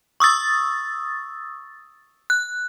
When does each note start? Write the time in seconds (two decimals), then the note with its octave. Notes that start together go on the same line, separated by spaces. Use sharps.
0.20 C#6 D#6 E6 A6
2.30 F#6